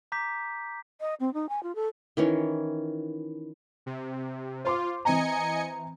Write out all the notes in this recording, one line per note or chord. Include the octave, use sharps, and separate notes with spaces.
A#5 D6 G6 B6
D#5
C4
D#4
G#5
F4
A4
D#3 E3 C#4 C#5
C3
F4 C5 C6 D6
E3 C4 D#5 G#5 A#5 C#7